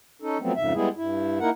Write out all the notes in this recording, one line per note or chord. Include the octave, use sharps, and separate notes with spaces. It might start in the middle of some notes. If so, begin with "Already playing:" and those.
C#4 D#4 A4
F3 F#3 A3 B3 C4
F2 G#2 C#3 E5
G3 G#3 B3 E4 G#4
G2 E4
A#3 D#4 E4 A#4 F#5